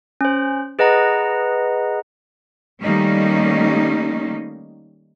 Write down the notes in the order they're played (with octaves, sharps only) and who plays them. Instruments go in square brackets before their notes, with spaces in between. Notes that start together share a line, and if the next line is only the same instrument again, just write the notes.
[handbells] C#4 C5
G#4 B4 D#5 F#5 A#5
[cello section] D#3 G3 A3 A#3 C#4 D#4